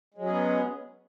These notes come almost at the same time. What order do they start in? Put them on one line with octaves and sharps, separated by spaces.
G#3 F#3 C#4 G#4 B3